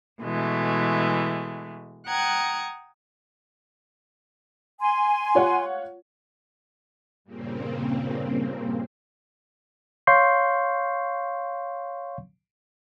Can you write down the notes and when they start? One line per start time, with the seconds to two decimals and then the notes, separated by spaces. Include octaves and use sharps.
0.21 B2 E3 G#3 A3
2.07 F#5 G5 A#5 D#6 F#6 G#6
4.80 G#5 C6
5.35 F4 C#5 F#5
7.24 G2 A#2 C#3 A#3 C4
10.07 C#5 F5 C6 C#6 G6 C7